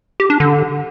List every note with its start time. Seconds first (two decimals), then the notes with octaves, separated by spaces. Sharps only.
0.20 G4
0.30 D4
0.40 D3